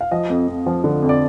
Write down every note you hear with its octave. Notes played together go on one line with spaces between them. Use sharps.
F5
F3 D#5
F2
F2
F3
D3
F2
D5